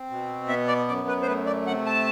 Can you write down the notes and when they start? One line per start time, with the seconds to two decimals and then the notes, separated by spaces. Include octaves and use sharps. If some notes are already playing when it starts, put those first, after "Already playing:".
Already playing: C4
0.10 B2
0.48 B3 E5
0.68 D5
0.88 F#2 D5
1.08 B4
1.22 C5
1.27 A3 B4
1.46 D5
1.66 C3 F#5
1.86 A5